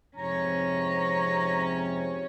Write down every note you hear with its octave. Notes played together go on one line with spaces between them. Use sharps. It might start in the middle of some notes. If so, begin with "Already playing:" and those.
F2 G#2 C3 C#4 C#5 A#5